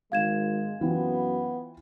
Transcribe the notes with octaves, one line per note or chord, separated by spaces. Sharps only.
G#1 G#3 F5 G#6 E7
F#2 E3 B3 C4 F4